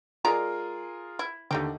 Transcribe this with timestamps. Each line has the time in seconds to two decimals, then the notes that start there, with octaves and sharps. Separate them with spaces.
0.25 G#3 F4 G#4 A#4 D5 A#5
1.19 E4
1.51 D#2 D3 A3 D#4 G4